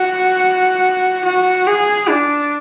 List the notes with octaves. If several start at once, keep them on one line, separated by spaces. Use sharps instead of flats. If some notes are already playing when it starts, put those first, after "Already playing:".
Already playing: F#4
F#4
G#4
D4